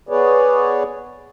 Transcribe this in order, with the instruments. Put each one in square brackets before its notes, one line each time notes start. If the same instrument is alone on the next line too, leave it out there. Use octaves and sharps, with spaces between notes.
[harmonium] B3 G#4 B4 C#5 D5